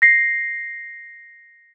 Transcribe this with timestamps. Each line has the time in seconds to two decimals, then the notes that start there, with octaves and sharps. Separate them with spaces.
0.02 A#6 C7